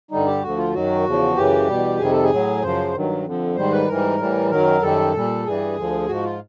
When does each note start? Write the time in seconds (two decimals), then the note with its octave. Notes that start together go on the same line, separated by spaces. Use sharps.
0.11 G2 D3 G3 D#4
0.26 G4
0.42 D2 D3 F3 F#4
0.58 F4
0.73 F#2 D#3 F#3 F#4
1.05 E2 C#3 F3
1.36 F#2 C#3 E3 G4
1.68 E2 B2 G3
1.99 F2 C3 D#3 G3 G#4
2.12 A4
2.23 G#4
2.31 A2 F#3
2.62 F#2 C#3 F3 C5
2.94 G2 D#3 F#3
3.25 F2 D3 F3
3.56 G#2 D#3 G3 C5
3.72 B4
3.88 G#2 E3 G3 A#4
4.19 A2 E3 G3
4.50 F#2 D#3 F#3 A#4
4.82 F#2 D#3 G3 A4
5.14 A#2 G3
5.45 G2 E3 G3 G#4
5.76 D2 D3 F3
6.08 G#2 F3 F#4
6.23 F4